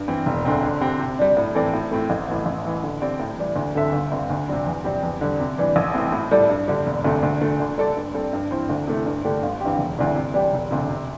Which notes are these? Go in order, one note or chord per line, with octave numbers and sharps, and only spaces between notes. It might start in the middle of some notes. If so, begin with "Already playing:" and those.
Already playing: G2
E3 C4 E4
E1
D2 D3 C4
D3
C4 G4
C3
G3 D4
A2
E3 C4 A4 D5
A2
A3 C4 E4
A1
A2 E3
A1
A2 E3
D3
C4 G4 D5
A2
E3 G3 E4
D2
D3 C4 A4 E5
G1
G2 D3 C4
D2
C3 G3 C4
E2
C3 G3 C4 G4
E2
D3 G3
C3
E3 G3 D4
A1
A2 E3 C4
A2
G3 E4 A4 D5
G2
D3 G3
E1
D2 C3 A3
D2
D3 A3
D3
G3 D4 A4 D5
G2
G3 C4 A4
G2
E3 C4 E4 C5
D2
C3 A3 E4
G2
D3 A3 D4 G4
G1
G2 E3 C4 G4
E1
D2 C3 G3 E4
C3
E3 G3 D4 G4
E1
D2 C3
C3